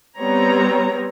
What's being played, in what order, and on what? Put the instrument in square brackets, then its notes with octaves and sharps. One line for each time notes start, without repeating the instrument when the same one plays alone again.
[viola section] G3 B3 C4 C#5 A#5